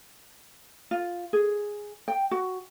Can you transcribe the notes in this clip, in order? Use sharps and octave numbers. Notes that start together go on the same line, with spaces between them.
F4
G#4
G5
F#4